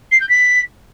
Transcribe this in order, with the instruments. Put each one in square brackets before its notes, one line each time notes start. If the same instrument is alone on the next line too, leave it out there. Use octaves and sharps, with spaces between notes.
[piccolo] C7
G6
B6